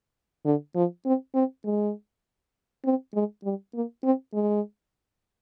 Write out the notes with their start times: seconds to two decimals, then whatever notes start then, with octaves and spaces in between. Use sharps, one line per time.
0.45 D3
0.76 F3
1.06 C4
1.35 C4
1.65 G#3
2.85 C4
3.14 G#3
3.44 G3
3.75 A#3
4.04 C4
4.34 G#3